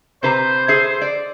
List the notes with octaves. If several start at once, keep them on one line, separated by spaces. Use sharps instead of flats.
C3 B4 C5 A#5
G#4 A4 E5
D5